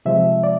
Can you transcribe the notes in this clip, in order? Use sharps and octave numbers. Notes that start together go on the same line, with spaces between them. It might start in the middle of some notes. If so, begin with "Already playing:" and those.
C3 F3 G#3 E5
D5